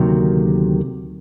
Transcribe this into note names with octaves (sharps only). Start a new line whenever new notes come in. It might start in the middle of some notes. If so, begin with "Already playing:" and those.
Already playing: D2 C3 D#3 F#3 A#3